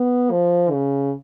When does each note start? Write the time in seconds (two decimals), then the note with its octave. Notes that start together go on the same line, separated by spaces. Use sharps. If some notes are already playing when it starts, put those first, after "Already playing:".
Already playing: B3
0.31 F3
0.71 C#3